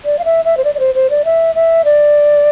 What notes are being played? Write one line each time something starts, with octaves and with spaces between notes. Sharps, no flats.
D5
F5
E5
E5
C5
D5
D5
C5
C5
D5
E5
E5
D5